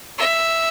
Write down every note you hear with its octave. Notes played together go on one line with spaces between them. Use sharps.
E5